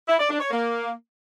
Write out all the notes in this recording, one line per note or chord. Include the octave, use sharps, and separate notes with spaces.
E4
D5
D4
C#5
A#3